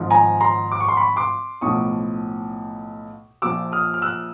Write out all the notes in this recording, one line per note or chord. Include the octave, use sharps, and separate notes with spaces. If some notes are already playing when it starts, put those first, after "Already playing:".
Already playing: G#1 G#2 F3
G#5 A#5
A#5 C6
D6
C#6
C6
B5 C#6
C6 D6
B1 A2 F3 C#6 D#6
A#1 A#2 F3 D6 E6
D#6 F6
F6
E6 F#6